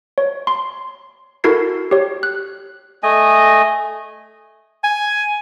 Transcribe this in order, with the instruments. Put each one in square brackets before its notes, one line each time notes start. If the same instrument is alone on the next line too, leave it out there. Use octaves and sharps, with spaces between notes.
[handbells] C#5
C6
E4 F#4 A4 A#4 G#6 C7
G4 C#5
F#6
[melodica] A3 D#5 G#5
[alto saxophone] G#5